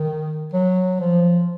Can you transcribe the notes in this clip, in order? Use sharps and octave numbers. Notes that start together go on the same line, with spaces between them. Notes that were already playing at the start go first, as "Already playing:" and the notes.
Already playing: D#3
F#3
F3